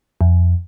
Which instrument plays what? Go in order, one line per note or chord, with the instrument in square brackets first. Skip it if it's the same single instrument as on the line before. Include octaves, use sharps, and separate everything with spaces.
[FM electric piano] F2